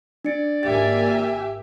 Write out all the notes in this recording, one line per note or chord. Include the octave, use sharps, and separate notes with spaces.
D4 D5 C#7
G#1 A#3 G4 E5 G#5 A6